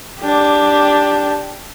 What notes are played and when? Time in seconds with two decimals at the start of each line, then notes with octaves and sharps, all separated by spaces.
0.20 D4 G4